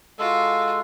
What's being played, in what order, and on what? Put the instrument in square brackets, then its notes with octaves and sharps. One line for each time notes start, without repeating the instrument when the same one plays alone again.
[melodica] G#3 A4 [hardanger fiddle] F4 F#4